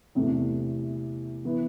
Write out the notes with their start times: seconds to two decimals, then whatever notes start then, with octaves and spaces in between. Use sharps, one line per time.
0.15 E2 C3 E3 A3
1.45 E3 B3